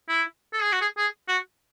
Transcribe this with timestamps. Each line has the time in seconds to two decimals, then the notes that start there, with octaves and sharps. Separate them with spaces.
0.09 E4
0.53 A4
0.63 G#4
0.72 F#4
0.82 G#4
0.98 G#4
1.28 F#4